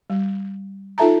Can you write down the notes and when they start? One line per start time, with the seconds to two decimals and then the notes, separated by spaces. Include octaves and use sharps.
0.10 G3
0.98 D#4 F4 A4 E5 A5 A#5